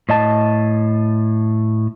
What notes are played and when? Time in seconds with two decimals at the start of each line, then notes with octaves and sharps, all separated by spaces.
0.09 A2 D#5 A5